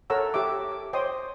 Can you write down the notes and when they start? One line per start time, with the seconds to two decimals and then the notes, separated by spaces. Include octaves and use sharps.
0.10 A4 A#4 C#5 F#5 A#5 E6
0.34 G4 C#5 E5 D6
0.71 D6
0.93 C5 C#5 D#5 G5 C6 D#6